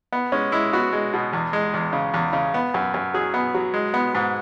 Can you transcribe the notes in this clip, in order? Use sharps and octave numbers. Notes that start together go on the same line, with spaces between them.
B3
G#3 C#4
G#3 E4
B3 F#4
G#3
B2
E2
G#3
E2
C#3
E2
C#3
B3
F#2
F#2
F#3 G#4
B3
F#3
G#3
B3
G#2